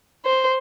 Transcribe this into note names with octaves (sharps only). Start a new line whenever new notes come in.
C5